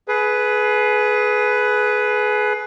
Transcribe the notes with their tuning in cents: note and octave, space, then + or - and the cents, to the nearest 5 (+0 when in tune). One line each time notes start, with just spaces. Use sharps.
G#4 +25 B4 +0